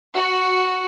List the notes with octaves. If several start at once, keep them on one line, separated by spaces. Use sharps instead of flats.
F#4